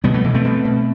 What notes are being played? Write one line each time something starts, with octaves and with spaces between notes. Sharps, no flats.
B2 G3 B3
F#3 A3
B2 E3
A3 C4
B2
B2